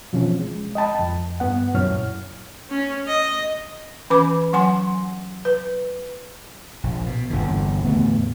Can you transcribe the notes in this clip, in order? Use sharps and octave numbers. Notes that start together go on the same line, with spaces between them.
B2 E3 F3 C4 C#4
G#3
D#5 G5 A5 B5
F2
G2 B3 F#5
C#2 F#2 A#2 E4 C#5 F6
C#4
D#5
E3 C#4 B4 B5 D6
F#3 F#5 G#5 C6
B4
A#1
B2
G1 E2 A#2 D3
E2 A2 D3 B3